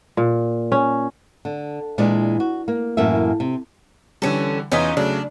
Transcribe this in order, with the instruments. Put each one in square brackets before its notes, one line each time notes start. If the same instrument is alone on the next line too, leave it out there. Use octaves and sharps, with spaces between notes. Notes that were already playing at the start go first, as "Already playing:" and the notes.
[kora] A#2
C#4
[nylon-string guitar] D3
A#2 E3 G#3 D4 D5
F#4
A#3
F#2 A2 E3 A#3 E5
C3
[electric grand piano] D3 E3 G3 [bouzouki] C#4 A4
[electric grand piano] E2 E3 B6 [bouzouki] C#4 D#4 F4
[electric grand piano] C#3 F#3 A3 [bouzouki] D4